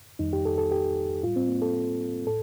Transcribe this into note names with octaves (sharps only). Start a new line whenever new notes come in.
F2 D#3 G3 D#4
G4
A4
A4
G4
A2 G3 F4
C4
A#3
A4
A2 A4